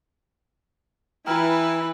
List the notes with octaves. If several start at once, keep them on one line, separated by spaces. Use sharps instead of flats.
E3 E4 B4 G5 A#5 F6